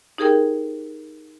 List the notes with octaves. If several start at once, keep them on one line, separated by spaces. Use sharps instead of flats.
D#4 G4 G#4 A#4 G5